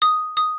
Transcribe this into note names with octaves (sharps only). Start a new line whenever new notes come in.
D#6
D#6